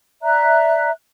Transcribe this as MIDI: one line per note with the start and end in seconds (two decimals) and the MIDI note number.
0.22 0.90 74
0.22 0.90 76
0.22 0.90 82
0.22 0.90 90